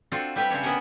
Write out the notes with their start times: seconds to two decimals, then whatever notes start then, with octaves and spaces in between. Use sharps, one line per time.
0.12 C4 D4 F4 F#4 A4 D5
0.36 G3 G4 B4 E5
0.50 C#3 C4 D4 C#5
0.63 B3 C#4 D4 A#4 F#5 G#5